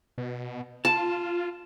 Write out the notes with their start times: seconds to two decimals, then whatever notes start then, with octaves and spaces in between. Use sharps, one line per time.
0.18 B2
0.85 F4 A5